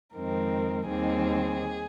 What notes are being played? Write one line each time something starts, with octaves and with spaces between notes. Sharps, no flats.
F2 D#3 G#3 C4 A#4
D#2 D#3 G3 C4 G#4